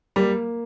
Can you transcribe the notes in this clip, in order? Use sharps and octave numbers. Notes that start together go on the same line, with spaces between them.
G3 A#3